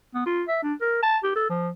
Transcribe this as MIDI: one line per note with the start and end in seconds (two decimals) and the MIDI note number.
0.14 0.23 59
0.26 0.43 65
0.48 0.60 76
0.63 0.74 62
0.81 1.02 70
1.03 1.18 81
1.23 1.31 67
1.36 1.49 69
1.50 1.69 53